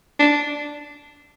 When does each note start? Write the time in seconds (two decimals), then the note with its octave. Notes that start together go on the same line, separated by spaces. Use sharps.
0.19 D4